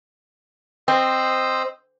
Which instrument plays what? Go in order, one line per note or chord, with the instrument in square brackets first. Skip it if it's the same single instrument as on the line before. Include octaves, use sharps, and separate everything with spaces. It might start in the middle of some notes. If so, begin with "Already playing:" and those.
[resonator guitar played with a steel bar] C4 [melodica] C5 D#5 E6